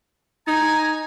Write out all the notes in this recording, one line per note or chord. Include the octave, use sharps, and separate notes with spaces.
D#4 G#5 A#5